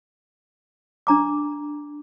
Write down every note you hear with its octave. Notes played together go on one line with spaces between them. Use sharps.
D4 A#5 D6